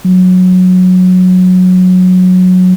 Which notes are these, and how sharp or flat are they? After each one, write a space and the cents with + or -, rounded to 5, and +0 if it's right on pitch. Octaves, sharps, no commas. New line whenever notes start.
F#3 -15